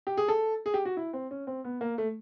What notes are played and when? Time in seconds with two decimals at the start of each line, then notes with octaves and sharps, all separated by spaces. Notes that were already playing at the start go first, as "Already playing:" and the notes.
0.07 G4
0.17 G#4
0.28 A4
0.66 G#4
0.74 G4
0.85 F#4
0.97 E4
1.13 C4
1.31 C#4
1.47 C4
1.64 B3
1.81 A#3
1.98 A3